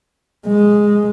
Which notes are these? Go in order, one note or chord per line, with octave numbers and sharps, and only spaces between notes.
G#3